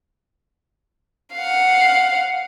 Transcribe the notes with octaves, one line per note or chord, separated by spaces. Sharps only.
F5 F#5